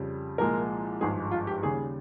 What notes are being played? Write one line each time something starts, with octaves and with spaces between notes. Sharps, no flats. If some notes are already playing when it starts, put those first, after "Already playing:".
Already playing: F2 C#3 G3
C2 A#2 F3 G#3 A#4
G#1 G2 F3 G#3 G#4
F4
G4
D#2 C#3 G3 G#4